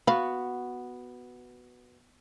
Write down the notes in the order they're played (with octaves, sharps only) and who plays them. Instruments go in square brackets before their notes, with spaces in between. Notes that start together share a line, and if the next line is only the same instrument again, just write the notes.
[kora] B3 F#4 [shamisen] F5 B5